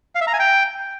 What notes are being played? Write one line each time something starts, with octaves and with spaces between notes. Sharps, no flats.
F5
E5
A#5
G#5
G5